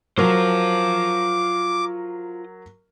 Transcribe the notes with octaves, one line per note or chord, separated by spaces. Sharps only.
F#3 F4 A#4 C5 D6